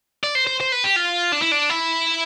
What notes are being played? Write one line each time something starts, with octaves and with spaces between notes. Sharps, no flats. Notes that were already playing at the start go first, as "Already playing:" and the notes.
D5
C5
C5
C5
B4
G4
F4
D4
E4
D4
E4